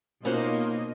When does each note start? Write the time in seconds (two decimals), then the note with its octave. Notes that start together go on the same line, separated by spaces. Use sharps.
0.25 B2 A#3 C#4 D#4 F4 F#4 C5 D#5